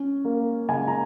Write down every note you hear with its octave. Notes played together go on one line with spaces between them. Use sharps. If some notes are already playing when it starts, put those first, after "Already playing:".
Already playing: C#4
A#3
C#3 G#5
A#5